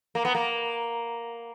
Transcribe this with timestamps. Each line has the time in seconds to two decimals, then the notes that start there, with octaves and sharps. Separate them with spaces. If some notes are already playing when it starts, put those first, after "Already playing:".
0.15 A#3
0.25 B3
0.35 A#3